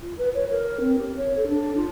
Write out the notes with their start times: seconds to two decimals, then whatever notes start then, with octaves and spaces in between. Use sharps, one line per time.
0.02 F4
0.18 B4
0.35 C#5
0.49 A#4
0.80 C4
0.98 G4
1.17 C#5
1.36 A4
1.48 D4
1.76 F4